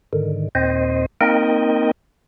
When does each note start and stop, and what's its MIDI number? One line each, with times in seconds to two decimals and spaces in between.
0.13 0.49 44
0.13 0.49 50
0.13 0.49 51
0.55 1.06 39
0.55 1.06 46
0.55 1.06 60
0.55 1.06 72
0.55 1.06 75
1.21 1.91 58
1.21 1.91 60
1.21 1.91 63
1.21 1.91 70
1.21 1.91 75
1.21 1.91 79